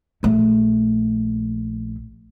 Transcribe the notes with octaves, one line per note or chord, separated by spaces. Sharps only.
A#1 A3